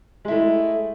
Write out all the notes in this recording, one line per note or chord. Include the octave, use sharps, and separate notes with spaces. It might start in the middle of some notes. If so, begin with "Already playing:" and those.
G#3 A3 E4